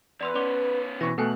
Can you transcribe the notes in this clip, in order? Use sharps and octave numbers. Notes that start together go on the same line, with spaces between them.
E2 B4 D5 C6 E6
B3 C#4 D5 C6 D6
B2 E3 C#6 A#6
B2 A3 A4 G5 G#5 F#6